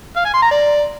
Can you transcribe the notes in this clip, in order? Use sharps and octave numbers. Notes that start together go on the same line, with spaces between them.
F5
G#5
C6
A#5
D5